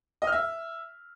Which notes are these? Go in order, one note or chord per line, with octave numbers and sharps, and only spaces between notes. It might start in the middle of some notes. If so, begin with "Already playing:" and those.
D#5
F6
E5